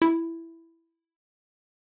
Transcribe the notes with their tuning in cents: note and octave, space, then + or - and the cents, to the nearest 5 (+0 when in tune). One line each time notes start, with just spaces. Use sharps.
E4 +5